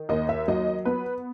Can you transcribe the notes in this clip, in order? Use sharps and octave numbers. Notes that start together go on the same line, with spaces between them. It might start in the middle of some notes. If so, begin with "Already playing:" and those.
Already playing: D#3
D#2 D#5
E5
F#3 D#5
B3 B4